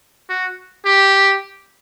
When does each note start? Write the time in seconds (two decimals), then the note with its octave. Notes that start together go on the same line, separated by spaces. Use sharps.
0.29 F#4
0.85 G4